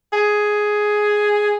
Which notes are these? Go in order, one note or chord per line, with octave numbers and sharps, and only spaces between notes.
G#4